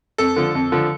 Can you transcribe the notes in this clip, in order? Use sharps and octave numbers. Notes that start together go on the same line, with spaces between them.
F2 A4
D3 F3
F2
D3 F3